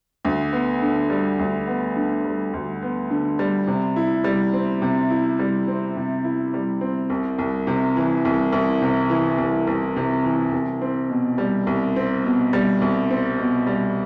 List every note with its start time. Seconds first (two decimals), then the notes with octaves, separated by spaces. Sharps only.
0.25 D2
0.53 B3
0.82 D3
1.10 G3
1.39 D2
1.67 B3
1.96 D3
2.25 G3
2.54 D2
2.82 B3
3.11 D3
3.39 G3
3.67 C3
3.96 E4
4.24 G3
4.53 C4
4.82 C3
5.10 E4
5.39 G3
5.68 C4
5.96 C3
6.24 E4
6.54 G3
6.81 C4
7.10 C2
7.38 C2
7.67 C3
7.96 E3
8.25 C2
8.52 C2
8.82 C3
9.09 E3
9.38 C2
9.67 C2
9.96 C3
10.24 E3
10.52 C2
10.82 C4
11.09 B2
11.38 G3
11.67 C2
11.96 C4
12.24 B2
12.53 G3
12.81 C2
13.10 C4
13.39 B2
13.67 G3